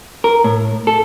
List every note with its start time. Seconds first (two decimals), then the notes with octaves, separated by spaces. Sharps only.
0.24 A#4
0.44 A2
0.87 A4